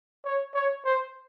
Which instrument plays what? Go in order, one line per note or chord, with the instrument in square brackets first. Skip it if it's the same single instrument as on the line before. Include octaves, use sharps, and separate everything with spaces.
[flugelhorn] C#5
C#5
C5